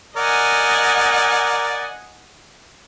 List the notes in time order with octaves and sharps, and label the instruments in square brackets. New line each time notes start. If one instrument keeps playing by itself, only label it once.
[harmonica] A#4 D5 [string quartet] D#5 F#5 G#5